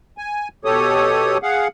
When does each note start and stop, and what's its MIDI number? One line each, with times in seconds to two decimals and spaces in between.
0.18 0.48 80
0.65 1.38 47
0.65 1.38 67
0.65 1.38 69
0.65 1.38 73
0.65 1.38 87
1.43 1.68 68
1.43 1.68 77
1.43 1.68 78